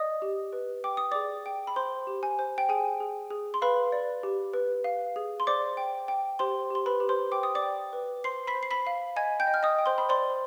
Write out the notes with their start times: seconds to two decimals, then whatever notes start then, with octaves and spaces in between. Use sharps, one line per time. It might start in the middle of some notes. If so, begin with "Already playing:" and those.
Already playing: D5 D#5 D#6
0.22 G4
0.53 B4
0.84 G5 D6
0.97 D#6
1.11 G#4 D5 D6
1.46 G5
1.67 B5
1.76 C5 C6
2.07 G4
2.23 G#5
2.39 C5
2.58 G5
2.69 G#4 G#5
3.00 G#4
3.30 G#4
3.54 C6
3.62 B4 F5 B5
3.92 D5
4.23 G4
4.54 B4
4.84 F5
5.16 G#4
5.40 C6
5.47 C5 D5 D6
5.77 G5
6.08 G5
6.39 G4 C5 C6
6.70 G4 C6
6.86 B4 B5
7.00 G4
7.09 C5 C6
7.32 G5 D6
7.43 D#6
7.55 D5 D6
7.62 G5
7.93 B4
8.24 C5 C6 C7
8.47 B5 B6
8.55 C5
8.63 C7
8.71 B5 B6
8.87 F5
9.16 D#5 G#5 G#6
9.40 G5 G6
9.47 D#5
9.54 F6
9.63 D#5 D#6
9.79 G5
9.86 C5 C6
9.98 B5
10.09 C5 D5 C6